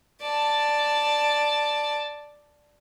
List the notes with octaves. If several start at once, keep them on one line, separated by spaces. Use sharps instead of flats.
D5 A5